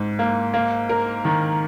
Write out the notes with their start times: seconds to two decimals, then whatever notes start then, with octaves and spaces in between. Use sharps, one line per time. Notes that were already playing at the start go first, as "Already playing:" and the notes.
Already playing: G#2
0.19 A#3
0.54 A#3
0.89 A#4
1.25 D#3